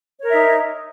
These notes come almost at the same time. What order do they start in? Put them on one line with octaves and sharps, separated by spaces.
C#5 A#4 E5 D#4